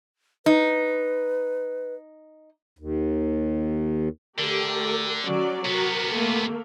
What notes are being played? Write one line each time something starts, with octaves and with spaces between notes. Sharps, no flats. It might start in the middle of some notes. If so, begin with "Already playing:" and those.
D#4 B4
D#2
D3 A3 G4 A#4
F#3 C#4 D5
C3 B3 F#4 A#4
A3 A#3